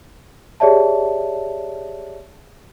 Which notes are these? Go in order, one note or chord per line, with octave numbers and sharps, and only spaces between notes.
G4 G#4 C#5 D5 E5 A5